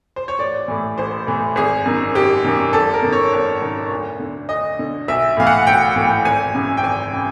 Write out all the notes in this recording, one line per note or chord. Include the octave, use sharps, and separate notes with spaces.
C5
C#5
A1 D5
A2 E3
A1 C5
A2 E3
G#1 G#4
F#2 D#3
G#1 G4
F#2 D#3
G#1 A4
A#4
F#2 D#3
C#5
G#1
F#2 D#3
D2
D3
D2 D#5
D3
B1 E5
A2 E3 F5
F#5
B1 G5
A2 E3
G#1 G#5
F#2 C#3 E3
G5
G#1 G#5
C#3 E3